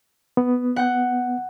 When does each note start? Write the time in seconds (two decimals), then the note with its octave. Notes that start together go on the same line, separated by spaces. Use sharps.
0.37 B3
0.76 F#5 G6